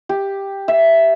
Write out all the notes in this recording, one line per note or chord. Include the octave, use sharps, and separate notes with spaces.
G4
E5